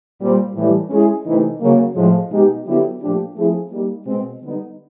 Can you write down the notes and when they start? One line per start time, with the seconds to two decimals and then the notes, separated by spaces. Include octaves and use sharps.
0.20 A#2 G3 C4
0.55 A2 E3 G3
0.90 G#3 C#4 E4 G#4
1.24 C3 E3 A3 C4 D#4
1.60 C#3 F#3 A#3
1.95 A2 F3 G#3
2.30 B2 G#3 B3 D#4 G4
2.64 D3 F#3 B3 E4 G4
3.00 A#2 F3 A3 D4 G4
3.35 F3 A3 C4 E4 G#4
3.70 G3 A#3 D#4 G4
4.05 B2 G#3 C4
4.40 D3 G3 B3 D#4